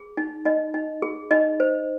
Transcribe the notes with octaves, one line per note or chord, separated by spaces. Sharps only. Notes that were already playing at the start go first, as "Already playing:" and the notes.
Already playing: G#4
D#4
D#4 D#5
D#4
G#4
D#4 D#5
C5